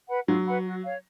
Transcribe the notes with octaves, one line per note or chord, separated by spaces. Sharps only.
B4 F#5 B5
F#3 F4
B4 F#5 B5
F#4
C#5 F5